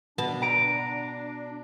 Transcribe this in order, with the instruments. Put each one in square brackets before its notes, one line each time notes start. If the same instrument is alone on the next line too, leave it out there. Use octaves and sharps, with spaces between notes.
[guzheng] B2 B3 A5 [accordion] D4
[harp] A#5 D7